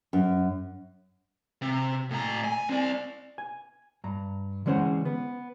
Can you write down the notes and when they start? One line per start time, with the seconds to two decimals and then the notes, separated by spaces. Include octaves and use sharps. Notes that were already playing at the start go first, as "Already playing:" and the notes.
0.13 F#2
1.62 C3
2.11 A2 A#5
2.44 G#5
2.69 C4 D5
3.38 G#5
4.04 G2 A#5
4.66 D3 E3 G#3 C#4 C5 F#5
5.05 B3